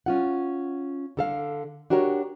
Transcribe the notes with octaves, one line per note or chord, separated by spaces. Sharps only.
C#4 F4 F#5
D3 A4 F5
D4 F#4 G4 A#4 C#5